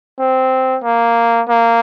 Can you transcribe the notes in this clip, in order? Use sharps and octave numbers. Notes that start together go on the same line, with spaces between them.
C4
A#3
A#3